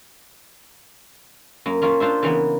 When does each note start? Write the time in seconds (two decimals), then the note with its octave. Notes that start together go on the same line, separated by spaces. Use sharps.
1.66 F#2 A#3
1.82 A#3 C#4 F4
2.00 D4 F4 C5 E5
2.22 C#3 E3 A#3 B3